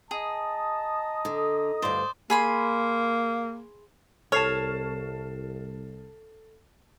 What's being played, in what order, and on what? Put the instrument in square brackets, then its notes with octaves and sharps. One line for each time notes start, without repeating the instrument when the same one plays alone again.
[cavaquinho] G#4 [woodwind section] D#5 A#5 D#6 [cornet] A5
[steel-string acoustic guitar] D3
[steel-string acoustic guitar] D2 G2 [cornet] F4 [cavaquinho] C5 D5
[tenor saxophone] A#3 [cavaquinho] G#4 B5 C6
[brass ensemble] C2 [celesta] A4 C7 E7 [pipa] C#5 [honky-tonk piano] A5 F6